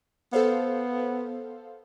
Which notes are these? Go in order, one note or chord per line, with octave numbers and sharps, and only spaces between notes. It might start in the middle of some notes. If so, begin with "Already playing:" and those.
B3 A4 C5 F5